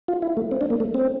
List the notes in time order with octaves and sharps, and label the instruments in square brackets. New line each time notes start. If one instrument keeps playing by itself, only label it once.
[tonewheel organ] F4
E4
A3
C4
D4
A#3
A3
C4